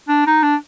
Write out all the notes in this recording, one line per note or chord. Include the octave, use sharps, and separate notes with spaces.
D4
D#4
D4